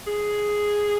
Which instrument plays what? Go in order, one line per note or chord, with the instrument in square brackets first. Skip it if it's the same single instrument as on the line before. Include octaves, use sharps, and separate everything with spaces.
[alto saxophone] G#4